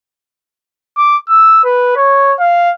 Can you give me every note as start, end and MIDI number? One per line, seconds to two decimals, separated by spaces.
0.97 1.17 86
1.30 1.64 88
1.64 1.93 71
1.96 2.34 73
2.40 2.71 77